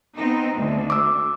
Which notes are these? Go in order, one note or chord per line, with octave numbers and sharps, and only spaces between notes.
B3 C4 D#4
D2
D6 E6